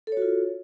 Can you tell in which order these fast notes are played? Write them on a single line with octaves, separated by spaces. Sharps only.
A4 C#5 F#4 F4